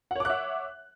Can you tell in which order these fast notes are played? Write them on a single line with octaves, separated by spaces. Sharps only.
F#5 C#5 D6 F#6 E5